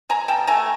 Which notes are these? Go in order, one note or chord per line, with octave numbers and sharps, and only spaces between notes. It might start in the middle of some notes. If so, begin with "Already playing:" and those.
F#3 G#5 A#5
B2 G5 A5
A3 G#5 A#5